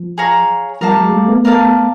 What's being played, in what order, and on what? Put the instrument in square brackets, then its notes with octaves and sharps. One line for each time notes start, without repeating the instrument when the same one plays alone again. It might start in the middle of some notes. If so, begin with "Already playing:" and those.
Already playing: [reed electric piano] F3
[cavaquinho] G#4 C#5 F5 A#5
[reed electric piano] F3 G3 [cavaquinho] A#4 D5 F5 A5
[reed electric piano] F#3 G#3
G3 A3
A3 B3
[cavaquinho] A#4 D5 F5 A5